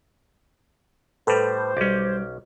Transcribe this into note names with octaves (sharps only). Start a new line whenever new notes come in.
A2 G3 A4 B4 C5
B1 G3 C#4 D6